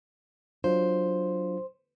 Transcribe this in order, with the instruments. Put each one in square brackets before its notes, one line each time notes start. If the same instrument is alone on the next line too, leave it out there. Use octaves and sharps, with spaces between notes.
[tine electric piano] F#3 D4 F4 [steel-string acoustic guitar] C5